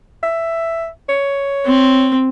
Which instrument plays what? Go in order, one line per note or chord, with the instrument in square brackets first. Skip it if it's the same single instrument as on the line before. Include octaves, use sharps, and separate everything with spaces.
[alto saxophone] E5
C#5
[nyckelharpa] C4